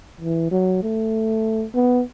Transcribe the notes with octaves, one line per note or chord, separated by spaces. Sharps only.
E3
F#3
A3
B3